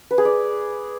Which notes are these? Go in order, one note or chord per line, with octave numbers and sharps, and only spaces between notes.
B4
G#4
D5